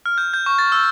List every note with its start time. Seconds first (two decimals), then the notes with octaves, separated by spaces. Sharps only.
0.06 F6
0.18 G6
0.34 G6
0.46 C#6
0.59 A6
0.72 E6